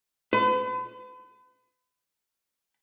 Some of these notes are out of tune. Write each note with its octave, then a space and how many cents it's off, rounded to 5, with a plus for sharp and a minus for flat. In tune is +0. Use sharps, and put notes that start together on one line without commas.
B4 +40